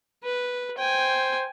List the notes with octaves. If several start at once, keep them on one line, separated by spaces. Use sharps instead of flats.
B4
C5 G5 G#5